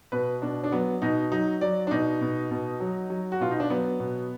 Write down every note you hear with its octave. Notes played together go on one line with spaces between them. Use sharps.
B2 B4
B2 D4
D4
F#3 B3
B2 D#4
F#3 D#4
F#3 D5
D4
B2 D#4
B2
B2
F#3
F#3
F#4
B2 F4
D#4
D4
F#3 B3
B2